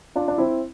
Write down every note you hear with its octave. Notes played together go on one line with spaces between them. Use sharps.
D4 F4
D4
C4 E4